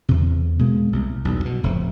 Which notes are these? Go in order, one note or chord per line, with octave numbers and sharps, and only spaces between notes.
E2 C3
B2 G#3 A#3
C2
B1 E2 G2
B2
F1 A2 C3